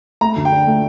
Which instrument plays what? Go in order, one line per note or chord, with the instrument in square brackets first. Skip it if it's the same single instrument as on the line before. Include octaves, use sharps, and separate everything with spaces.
[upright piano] A3 [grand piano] A#5
[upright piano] D2
[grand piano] G5
[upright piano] D4
A3